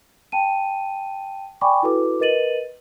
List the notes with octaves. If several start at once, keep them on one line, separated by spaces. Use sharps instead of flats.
G5 A5 D#7
D5 G5 G#5 B5 C#6 D6
E4 F#4 A4 B4 D6
A#4 B4 D#5 A6 D#7 F#7